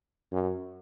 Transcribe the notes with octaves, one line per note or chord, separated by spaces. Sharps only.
F#2